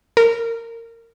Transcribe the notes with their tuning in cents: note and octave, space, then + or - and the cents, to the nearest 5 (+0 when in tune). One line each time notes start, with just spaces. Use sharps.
A#4 -20